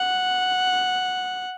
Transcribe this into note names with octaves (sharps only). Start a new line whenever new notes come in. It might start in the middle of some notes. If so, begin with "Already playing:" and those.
Already playing: F#5